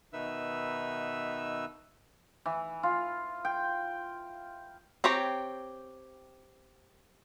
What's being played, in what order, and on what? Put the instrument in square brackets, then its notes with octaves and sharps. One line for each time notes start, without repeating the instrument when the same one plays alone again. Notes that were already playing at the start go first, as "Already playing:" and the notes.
[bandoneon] B2 D#3 D#4 B4 E5 E6
[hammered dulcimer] E3
F4
G5
[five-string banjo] C4 G4 C#5 A#5